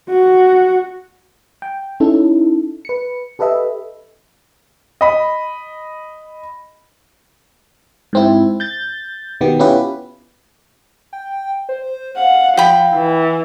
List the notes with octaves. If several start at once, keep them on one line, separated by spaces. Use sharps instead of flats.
F#4
G5
C#4 D#4 E4 A4
B4 C#7
G4 A4 B4 D#5 E5
D#5 B5
G#2 C4 E4
G6 A6
B2 D#3 B3 G4
B3 C#4 E4 F4 G4 B4
G5
C5
F5 F#5
F3 G5 B5
E3